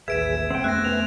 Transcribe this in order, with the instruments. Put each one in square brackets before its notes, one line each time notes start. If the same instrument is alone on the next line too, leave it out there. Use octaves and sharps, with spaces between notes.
[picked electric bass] A1 D#2 [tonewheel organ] G#4 B4 [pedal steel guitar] E5 [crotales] G#6 D7 E7
[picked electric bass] C2 [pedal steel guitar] C4 G5 [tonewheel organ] F#5
[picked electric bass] F2 A3 B3 [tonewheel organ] C#4 [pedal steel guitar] C5 E5 [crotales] F#6 A#6
[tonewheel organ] B4 G#5 [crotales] F7